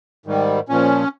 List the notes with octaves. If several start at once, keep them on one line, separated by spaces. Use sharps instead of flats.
G#2 D#3 G3
A#2 F3 C#4